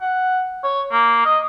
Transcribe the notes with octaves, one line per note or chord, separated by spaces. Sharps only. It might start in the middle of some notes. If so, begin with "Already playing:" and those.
F#5
C#5
A#3
D#5